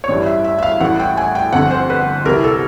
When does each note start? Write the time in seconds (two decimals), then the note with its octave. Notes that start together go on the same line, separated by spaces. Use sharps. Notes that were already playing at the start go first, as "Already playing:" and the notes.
0.04 C#5
0.08 A1 G2 E3 D5
0.26 E5
0.44 E5
0.58 E5
0.63 F5
0.80 A1 A2 E3 F#5
1.00 G5
1.17 G#5
1.35 G5
1.53 G1 F2 D3 F#5
1.71 C5
1.90 B4
2.25 C2 C3 E3 A#4
2.44 A4